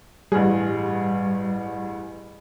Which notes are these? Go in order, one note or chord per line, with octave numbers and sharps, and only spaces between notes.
A1 G2 G3 G#4